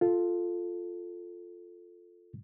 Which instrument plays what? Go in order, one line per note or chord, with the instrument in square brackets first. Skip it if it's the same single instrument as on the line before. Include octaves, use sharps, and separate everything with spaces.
[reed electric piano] F4 A4